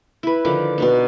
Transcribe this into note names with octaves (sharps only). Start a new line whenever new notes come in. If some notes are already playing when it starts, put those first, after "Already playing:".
E4 B4
D3 D#3 F3 D5
B2 D4 D#4